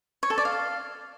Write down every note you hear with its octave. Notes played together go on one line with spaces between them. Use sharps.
C#5
A4
D5
F5